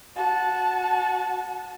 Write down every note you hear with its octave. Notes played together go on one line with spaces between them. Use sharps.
F#4 A5